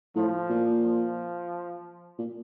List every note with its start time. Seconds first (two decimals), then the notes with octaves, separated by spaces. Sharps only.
0.16 A2 F3
0.50 A#2
0.83 F3
2.19 A#2